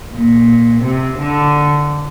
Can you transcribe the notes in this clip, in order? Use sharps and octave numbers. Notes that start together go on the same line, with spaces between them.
A#2
C3
D3